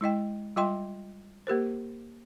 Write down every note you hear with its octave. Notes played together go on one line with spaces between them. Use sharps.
G#3 E4 D#5 G5
G3 F4 D#5 G5 C6
A#3 G4 A#4 C5